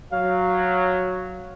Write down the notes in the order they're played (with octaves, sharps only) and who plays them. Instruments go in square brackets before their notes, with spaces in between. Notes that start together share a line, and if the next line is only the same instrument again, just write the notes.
[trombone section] F#3 [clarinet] F5